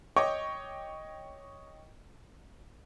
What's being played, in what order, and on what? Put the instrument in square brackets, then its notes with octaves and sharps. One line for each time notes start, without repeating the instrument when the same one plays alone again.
[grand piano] C#5 D#5 G5 C#6 D6